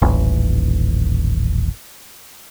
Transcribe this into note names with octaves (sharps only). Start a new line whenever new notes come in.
D#1 A1